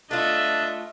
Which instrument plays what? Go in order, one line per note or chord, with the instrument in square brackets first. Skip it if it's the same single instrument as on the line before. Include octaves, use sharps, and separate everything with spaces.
[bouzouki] A3 F4 [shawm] D4 [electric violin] D#5 E5